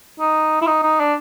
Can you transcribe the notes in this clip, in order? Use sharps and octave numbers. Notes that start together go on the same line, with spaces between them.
D#4
E4
D#4
D#4
D4